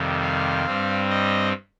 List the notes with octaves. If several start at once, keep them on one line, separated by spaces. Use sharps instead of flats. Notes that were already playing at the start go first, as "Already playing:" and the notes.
Already playing: F2 C3 D#3 G3
F5
G2 G3 C4
D#5